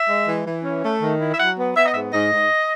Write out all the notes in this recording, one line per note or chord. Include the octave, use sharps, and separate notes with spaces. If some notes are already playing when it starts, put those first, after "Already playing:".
Already playing: E5
G#3
E3
E3
C#4
A3
D#3
E4
E5
F#3 F#5
B3
B3 E5
D#5
G#2 E5
G#2 D#5
G#2